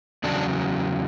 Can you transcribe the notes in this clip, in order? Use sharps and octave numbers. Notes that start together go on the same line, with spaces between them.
E2 C#3 F#3 D4